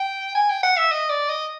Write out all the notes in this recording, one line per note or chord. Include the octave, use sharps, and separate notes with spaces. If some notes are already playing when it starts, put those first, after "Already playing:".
Already playing: G5
G#5
G5
F#5
E5
D#5
D5
D#5